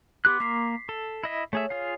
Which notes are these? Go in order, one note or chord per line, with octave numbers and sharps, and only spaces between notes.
B3 G4 C6 D6 F#6 B6
A#3 A#4 B6 C7
A4
E4 D#5 E5
A3 G#4 C#5 E5
F4 G#4 F5